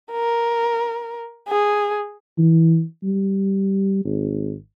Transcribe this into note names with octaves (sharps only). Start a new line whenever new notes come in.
A#4
G#4
E3
G3
G#1